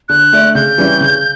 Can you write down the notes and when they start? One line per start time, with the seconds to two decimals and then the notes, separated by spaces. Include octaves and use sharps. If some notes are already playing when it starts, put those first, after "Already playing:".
0.09 D3 F#6
0.33 A3 D4
0.55 C#3 G6
0.78 E3 G3 C#4
1.00 C#3